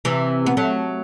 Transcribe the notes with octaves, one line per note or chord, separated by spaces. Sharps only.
C3 E3
B3
F#3 A3